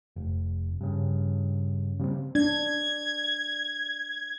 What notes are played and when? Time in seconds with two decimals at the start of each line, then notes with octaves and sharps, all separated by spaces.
0.16 F1
0.81 G2 C#3
1.99 C#3 G3 B3 C4
2.35 D4 G#6